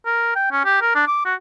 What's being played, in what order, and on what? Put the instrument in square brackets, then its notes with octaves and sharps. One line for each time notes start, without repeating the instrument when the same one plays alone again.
[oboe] A#4
G5
C#4
G4
A#4
D4
D6
F#4